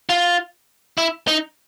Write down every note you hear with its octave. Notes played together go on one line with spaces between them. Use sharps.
F4
E4
D#4